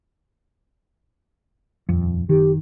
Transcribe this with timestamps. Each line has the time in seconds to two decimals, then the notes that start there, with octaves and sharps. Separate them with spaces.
1.89 D#1 F2
2.29 F#1 D#3 G4